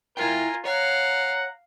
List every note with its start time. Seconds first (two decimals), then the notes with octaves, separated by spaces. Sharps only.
0.17 E4 F4 A#4 E5 G5 G#5
0.65 C#5 F5 F#5 A#5